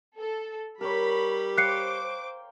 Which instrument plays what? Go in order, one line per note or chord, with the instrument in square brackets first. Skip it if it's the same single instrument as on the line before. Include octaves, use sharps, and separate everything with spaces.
[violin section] A4
[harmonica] G3 [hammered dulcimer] A#4 C#5 [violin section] B5
[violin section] C5 D6 [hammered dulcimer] C#5 F5 G5 [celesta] F#6 C7 C#7